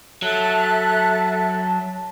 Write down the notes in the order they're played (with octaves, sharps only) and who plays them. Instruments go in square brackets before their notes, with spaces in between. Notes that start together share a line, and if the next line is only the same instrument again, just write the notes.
[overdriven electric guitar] F#3 [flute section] A4 E5 F#6 [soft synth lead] A5